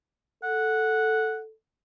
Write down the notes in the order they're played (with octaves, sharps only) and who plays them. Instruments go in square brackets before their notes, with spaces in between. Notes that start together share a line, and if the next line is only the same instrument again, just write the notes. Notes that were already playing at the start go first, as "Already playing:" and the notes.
[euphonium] A4 [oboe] F#5